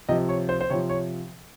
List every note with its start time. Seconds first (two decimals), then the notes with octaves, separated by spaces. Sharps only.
0.09 C3 F3 D#5
0.29 C#5
0.49 C5
0.61 C5
0.70 C3 F3 C#5
0.89 C#5